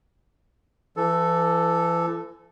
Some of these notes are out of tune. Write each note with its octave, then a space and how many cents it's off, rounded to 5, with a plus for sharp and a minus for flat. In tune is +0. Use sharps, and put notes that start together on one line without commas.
E3 +40 A4 +0